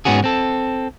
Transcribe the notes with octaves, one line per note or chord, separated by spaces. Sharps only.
G#2 B3 C#4 F#4 G#4
C4 A4